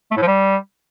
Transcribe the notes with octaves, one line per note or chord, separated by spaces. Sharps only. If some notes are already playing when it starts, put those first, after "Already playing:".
A3
A2
F3
G3